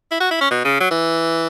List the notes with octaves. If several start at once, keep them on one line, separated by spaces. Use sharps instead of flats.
E4
F#4
E4
C#4
B2
C#3
F#3
E3